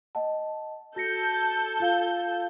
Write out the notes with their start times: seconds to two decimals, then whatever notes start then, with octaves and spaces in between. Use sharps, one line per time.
0.15 D#5 F#5 A5
0.96 F#4 A4 G6 A#6 C#7
1.80 F4 F5 G7